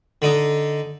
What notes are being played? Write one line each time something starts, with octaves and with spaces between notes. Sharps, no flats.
D3 D#4